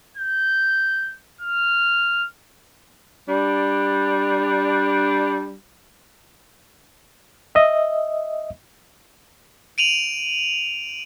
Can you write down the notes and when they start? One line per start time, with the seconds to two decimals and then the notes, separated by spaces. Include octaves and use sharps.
0.17 G6
1.41 F6
3.29 G3 D4
7.55 D#5 E5
9.78 D7 D#7 F7 F#7